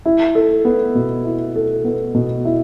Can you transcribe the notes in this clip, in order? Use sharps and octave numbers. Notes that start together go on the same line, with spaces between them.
E4
A4
B3
B2
E4
A4
B3
B2
E4